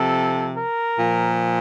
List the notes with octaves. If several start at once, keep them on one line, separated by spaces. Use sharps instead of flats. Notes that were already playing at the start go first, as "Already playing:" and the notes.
Already playing: C3 F3 A4
A#4
A#2 F3